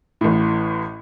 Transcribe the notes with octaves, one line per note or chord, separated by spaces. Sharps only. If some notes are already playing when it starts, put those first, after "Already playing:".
A1 A2